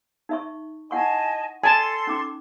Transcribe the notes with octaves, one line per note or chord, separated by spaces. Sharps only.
D#4 E5 C#6
E4 D#5 F#5 G#5 A5 C#6
A4 G#5 A5 C6
C#4 D#4 D6